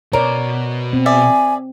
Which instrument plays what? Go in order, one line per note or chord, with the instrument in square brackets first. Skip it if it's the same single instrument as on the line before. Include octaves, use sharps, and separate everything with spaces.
[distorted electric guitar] B2 [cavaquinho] A#4 [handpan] C#5 D5
[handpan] C4
[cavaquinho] G#4 D5 E5 [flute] G#5